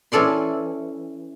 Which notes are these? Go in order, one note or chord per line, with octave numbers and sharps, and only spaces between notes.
E3 C#4 A4 D5 C6